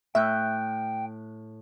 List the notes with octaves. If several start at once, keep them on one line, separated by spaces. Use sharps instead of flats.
A2 E5 G5 F#6 G6